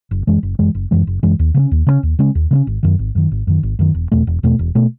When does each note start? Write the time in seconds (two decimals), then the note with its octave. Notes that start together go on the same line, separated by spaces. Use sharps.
0.11 F#1
0.27 F#2 E3 G#3
0.43 F#1
0.59 F#2 E3 G#3
0.75 F#1
0.91 F#2 E3 G#3
1.07 F#1
1.23 F#2 E3 G#3
1.39 D#2
1.54 C#3 G#3 C#4
1.71 D#2
1.87 C#3 G#3 C#4
2.03 D#2
2.19 C#3 G#3 C#4
2.35 D#2
2.51 C#3 G#3
2.55 C#4
2.67 G#1
2.83 F#2 D#3
2.99 G#1
3.15 F#2 D#3
3.32 G#1
3.47 F#2 D#3
3.63 G#1
3.79 F#2 D#3
3.94 E1
4.12 E2 B2 A3
4.27 E1
4.43 E2 B2 A3
4.59 E1
4.75 B2 A3